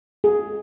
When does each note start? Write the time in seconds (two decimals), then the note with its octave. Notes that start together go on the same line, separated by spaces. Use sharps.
0.24 G#4